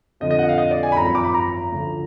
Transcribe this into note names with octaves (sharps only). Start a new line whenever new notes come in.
F2 D3 F3 D#5
D#5
F#5
F5
D#5
D5
G#5
B5
G#1 F#2 F3 A#5
B5
D6
B5
A#5
D2 D3 F3